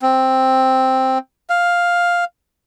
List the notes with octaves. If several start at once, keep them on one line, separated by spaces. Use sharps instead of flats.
C4
F5